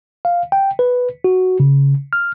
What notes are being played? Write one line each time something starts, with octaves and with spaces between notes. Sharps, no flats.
F5
G5
B4
F#4
C#3
F6